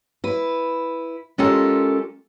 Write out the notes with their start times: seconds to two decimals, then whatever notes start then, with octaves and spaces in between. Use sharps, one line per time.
0.24 E4 B4
1.38 G#3 C#4 F4 G4 A4 A#4